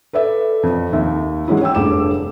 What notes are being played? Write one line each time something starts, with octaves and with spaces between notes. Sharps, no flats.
A4 B4 D5 E5
F2
D#2 E5
F#3 G#3 C#4 E4
C#5 G5 E6
F1 G2 G#4 D6 E7